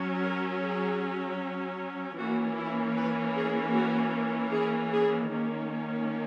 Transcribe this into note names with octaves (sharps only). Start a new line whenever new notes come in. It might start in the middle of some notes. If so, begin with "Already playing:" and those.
Already playing: F#3 C#4
A#4
G#4
E3 A#3 C#4 F#4
E4
B4
G#4
F#4
G#4
G#4
D#3 A#3 C#4